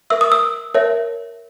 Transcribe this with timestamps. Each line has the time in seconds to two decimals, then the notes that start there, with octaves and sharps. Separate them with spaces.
0.10 A#4 E5 E6
0.21 D#6
0.32 E6
0.74 A#4 C#5 E5